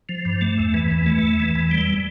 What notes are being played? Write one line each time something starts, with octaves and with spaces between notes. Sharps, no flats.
F3
G2
A3
E2
E3
E2
A3
E2
E3
E2
G3